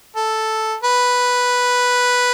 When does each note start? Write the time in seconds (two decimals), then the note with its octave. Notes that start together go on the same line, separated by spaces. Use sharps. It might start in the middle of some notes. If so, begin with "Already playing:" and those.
0.16 A4
0.83 B4